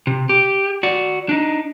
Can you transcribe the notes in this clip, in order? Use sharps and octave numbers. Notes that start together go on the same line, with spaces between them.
C3
G4
F#4 D5
D4 D#4